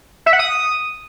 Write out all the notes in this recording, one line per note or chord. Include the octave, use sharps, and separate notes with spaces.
E5
F#5
D#6